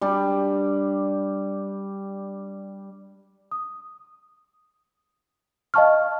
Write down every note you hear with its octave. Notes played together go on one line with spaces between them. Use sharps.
G3 D4
D#6
D#5 F5 A5 C#6 F6